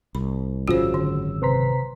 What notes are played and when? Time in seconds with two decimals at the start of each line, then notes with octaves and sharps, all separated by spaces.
0.15 C2 B5
0.68 G#1 F#2 C#3 F4 F#4 C5 E6
0.94 D3
1.42 C3 B4 C5 A#5 C6 B6